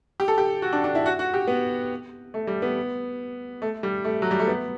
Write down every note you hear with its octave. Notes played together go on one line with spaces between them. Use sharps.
G4
A4
G4
F#4
D4
D4
E4
F#4
F#4
G4
B3
A3
G3
B3
A3
G3
A3
F#3
G3
A3
B3